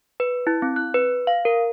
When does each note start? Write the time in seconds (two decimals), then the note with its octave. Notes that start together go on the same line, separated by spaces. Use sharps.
0.20 B4
0.47 E4
0.62 C4
0.76 F#6
0.94 B4
1.27 F5
1.45 A#4